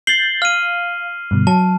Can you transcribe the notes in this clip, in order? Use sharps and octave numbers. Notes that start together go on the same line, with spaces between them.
G6 A6 C7 F#7 G7
F5 F6 D#7
G2 B2 D3
F#3 A5